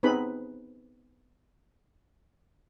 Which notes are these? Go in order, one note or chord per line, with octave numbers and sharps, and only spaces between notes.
B3 C4 D#4 G#4 B4 B5